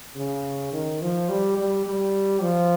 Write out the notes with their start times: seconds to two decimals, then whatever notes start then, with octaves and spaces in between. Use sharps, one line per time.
0.16 C#3
0.73 D#3
1.02 F3
1.29 G3
1.58 G3
1.86 G3
2.42 F3